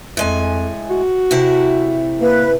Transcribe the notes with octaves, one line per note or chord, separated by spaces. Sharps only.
F2 A2 G#3 G#5
F#4
C3 A3 E4
A#3 B4